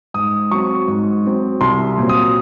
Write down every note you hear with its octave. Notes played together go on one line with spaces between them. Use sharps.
G#2 D#6
F#3 C4 C#6
G#2
F#3 C4
C2 C6
A#2 F#3 C4
D#6